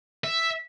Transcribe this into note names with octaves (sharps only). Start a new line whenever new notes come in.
E5